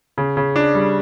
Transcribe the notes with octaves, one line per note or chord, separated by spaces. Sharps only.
C#3
C#3
D4
G3